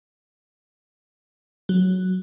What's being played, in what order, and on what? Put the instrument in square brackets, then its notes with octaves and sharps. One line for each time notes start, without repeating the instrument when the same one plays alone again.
[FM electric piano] F#3